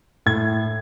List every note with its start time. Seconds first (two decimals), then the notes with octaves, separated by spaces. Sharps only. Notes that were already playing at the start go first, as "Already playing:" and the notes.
0.26 A2 G#6